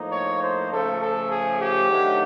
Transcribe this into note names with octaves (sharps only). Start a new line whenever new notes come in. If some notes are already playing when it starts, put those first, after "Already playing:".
Already playing: A2 F3 A#3 D#4
C#5
C5
C#3 F3 A3 C#4 A4
A4
G#4
G4
D#3 F#3 A3 D4